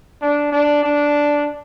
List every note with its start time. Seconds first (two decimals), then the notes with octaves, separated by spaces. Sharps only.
0.22 D4
0.52 D4
0.83 D4